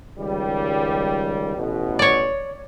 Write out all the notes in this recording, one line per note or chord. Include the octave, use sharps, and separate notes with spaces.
C#2 D#3 G3
A1 B2
C#5 D5